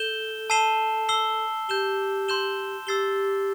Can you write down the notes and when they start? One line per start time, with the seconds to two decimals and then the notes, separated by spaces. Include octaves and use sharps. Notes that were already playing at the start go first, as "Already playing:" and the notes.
Already playing: A4 G6 E7 G7
0.50 A5 E6 C7 E7 G7
1.09 E6 C7 G7
1.69 G4 G6 E7 G7
2.28 C6 G6 E7 G7
2.87 G4 E6 A6 C7 G7